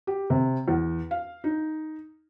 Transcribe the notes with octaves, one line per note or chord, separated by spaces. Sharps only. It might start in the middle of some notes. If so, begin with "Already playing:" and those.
G4
C3
E2
F5
D#4